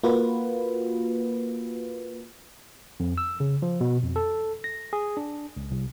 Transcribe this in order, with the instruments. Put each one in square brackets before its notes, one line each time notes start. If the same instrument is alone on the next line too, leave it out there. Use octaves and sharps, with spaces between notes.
[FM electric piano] A#3 F4 F#4 B4
[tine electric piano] F2
E6
C#3
F3
B2
F2
A4
A#6
G#4
D4
C#2
C2